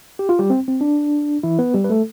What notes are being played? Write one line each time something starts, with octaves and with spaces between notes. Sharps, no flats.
G4
F4
G3 G4
C4
C4
D4
E3 E4
B3 B4
G3 G4
B4
A3 A4